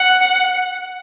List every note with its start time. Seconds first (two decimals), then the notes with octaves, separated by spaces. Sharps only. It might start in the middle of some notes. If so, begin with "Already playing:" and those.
Already playing: F#5